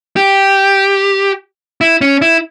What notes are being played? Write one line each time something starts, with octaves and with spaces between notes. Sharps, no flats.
G4
E4
C#4
E4